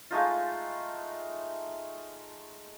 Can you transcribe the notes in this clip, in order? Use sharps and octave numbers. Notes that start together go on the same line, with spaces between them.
G#3 A3 D#4 F4